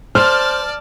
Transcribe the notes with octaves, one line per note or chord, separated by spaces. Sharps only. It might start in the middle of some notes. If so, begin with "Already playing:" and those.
C5 D5 A5 F6